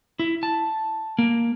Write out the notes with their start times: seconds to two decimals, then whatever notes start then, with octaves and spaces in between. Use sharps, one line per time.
0.19 E4
0.43 A5
1.18 A#3